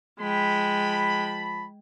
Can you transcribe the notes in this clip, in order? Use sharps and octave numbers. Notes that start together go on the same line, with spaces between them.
F3 G#3 G5 A5 B5